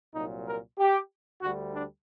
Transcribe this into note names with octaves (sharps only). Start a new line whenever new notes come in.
C2 A#2 F#3 D#4
A#4
G4
D2 D3 G3 F#4
D4